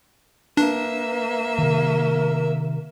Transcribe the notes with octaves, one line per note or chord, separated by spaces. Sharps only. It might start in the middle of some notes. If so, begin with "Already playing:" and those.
A#3 D4 B4 E5
C3 D#3 A#4